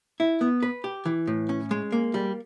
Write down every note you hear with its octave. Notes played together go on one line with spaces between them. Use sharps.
E4
B3
B4
G4
E3
A2
C#4
G#3
A#3
G3